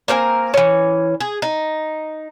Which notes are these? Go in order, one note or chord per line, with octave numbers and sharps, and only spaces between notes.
A#3 C4 A#4 G#5
E3 C#4
G#4
D#4